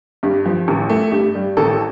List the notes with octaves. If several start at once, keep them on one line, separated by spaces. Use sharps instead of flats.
G2 G4
F3
A1
A3
G2 G4
G3
A1 A4